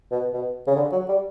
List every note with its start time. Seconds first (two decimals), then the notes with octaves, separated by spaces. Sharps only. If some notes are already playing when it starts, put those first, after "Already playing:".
0.11 B2
0.33 B2
0.67 C#3
0.76 D3
0.92 F#3
1.08 G3